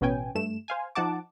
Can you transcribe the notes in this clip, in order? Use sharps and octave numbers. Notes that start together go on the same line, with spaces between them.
A1 B2 B3 C#4 G5 G#5
G2 A3 E7
C5 F5 G#5
F3 D#4 F#5 A5 D6